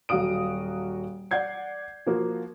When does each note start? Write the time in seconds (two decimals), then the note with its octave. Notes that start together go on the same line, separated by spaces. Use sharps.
0.09 D#1 F#3 F#4 F5 D#6 D7
1.31 D5 F#5 G6 G#6 C7
2.07 F3 A#3 F#4